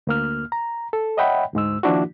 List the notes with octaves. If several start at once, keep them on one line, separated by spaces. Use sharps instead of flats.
D2 A#3 F6
A#5
A4
C#5 D#5 E5 F#5 G5 B5
D2 G#2 G#3 E6
D#3 F3 A#3 D4 E4 F#4